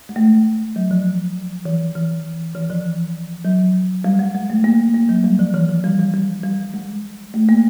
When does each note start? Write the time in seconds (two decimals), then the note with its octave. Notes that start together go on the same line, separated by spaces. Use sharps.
0.09 G#3
0.16 A3
0.76 F#3
0.91 F3
1.65 E3
1.95 E3
2.55 E3
2.70 F3
3.45 F#3
4.05 G3
4.19 G#3
4.35 G#3
4.50 A3
4.64 A#3
4.94 A#3
5.09 F#3
5.24 G3
5.39 F3
5.54 E3
5.69 F3
5.84 G3
5.99 G3
6.14 G3
6.44 G3
6.74 G#3
7.34 A3
7.49 A#3